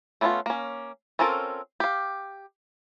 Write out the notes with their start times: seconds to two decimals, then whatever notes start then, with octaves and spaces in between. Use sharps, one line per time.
0.21 A3 B3 C#4 E4 F4
0.46 A#3 C#4
1.19 C4 C#4 F4 A4 A#4
1.80 G4 F5